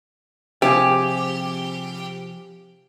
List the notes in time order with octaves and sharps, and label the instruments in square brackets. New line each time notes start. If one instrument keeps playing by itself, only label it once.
[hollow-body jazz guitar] C3 F3 G#4 [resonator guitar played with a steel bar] G4